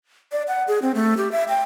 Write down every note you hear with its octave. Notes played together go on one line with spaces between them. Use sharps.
D5
F#5
G#4
C4
A3
G4
E5
G5